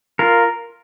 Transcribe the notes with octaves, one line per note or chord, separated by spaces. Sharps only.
F4 A#4